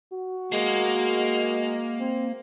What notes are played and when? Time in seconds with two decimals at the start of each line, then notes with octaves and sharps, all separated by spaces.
0.13 F#4
0.52 G#3 A#3
2.00 C4